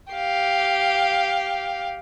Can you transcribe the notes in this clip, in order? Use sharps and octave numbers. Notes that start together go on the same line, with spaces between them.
G4 F5